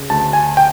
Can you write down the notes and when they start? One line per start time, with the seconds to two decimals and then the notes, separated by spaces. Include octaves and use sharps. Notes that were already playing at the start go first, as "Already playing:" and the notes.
Already playing: C#3
0.10 D2 A5
0.33 G#5
0.57 G5